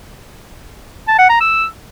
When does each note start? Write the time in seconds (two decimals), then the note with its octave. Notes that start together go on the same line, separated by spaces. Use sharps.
1.08 A5
1.19 F#5
1.30 A#5
1.41 E6